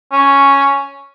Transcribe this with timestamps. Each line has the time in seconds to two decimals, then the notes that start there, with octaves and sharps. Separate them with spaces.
0.12 C#4